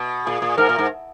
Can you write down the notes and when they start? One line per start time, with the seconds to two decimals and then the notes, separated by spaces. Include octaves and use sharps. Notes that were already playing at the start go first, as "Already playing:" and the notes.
Already playing: B2
0.26 A#2 G#4
0.42 A#2
0.58 G#2 A#4
0.69 A#2
0.78 G#2